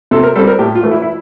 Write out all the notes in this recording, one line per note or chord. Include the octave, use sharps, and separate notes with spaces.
C3 A4
A#4
G3 C4 A4
A#4
A2 G4
F4
E3 A3
E4
E4